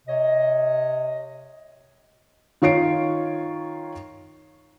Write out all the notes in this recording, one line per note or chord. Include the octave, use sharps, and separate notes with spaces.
C3 C#5 D#5
D#3 F4 C#5 C7 D7